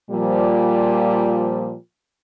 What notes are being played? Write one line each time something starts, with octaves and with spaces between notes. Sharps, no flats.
A#2 F3 G3